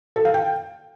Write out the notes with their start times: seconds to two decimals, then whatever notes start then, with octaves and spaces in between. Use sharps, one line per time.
0.16 A4
0.25 F5
0.34 G5